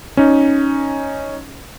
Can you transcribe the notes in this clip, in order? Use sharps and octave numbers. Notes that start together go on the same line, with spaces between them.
C#4 D#4